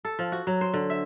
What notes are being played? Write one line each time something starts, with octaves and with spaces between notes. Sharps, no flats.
A4
F3
F#4
F#3
C5
D3
E5